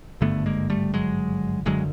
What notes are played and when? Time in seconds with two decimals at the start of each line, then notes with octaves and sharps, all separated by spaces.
0.21 G#1 G2 D3 A3 B3
0.46 G#3 A#3
0.70 G3 A3
0.94 F#3 G#3
1.66 F#1 F#2 D3 F#3 G#3